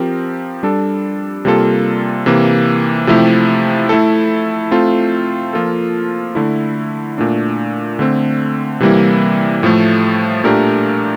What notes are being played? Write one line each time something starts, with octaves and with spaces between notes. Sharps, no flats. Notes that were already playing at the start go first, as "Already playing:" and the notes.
Already playing: F3 C4 G4 A#4
G3 D4 A4
C3 G3 A#3 F4 A4
C3 E3 A#3
C3 F3 A3 E4 G4
A3 E4 A4
A3 C4 F4 A4
F3 A#3 F4 A4
D3 A3 E4
A#2 A3 D4
D3 A3 C4
C3 E3 G3 A#3 E4
A2 F3 A3
A#2 A3 D4 G4 A#4